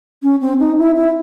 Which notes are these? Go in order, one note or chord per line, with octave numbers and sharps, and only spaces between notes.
C#4
C4
D#4
E4
E4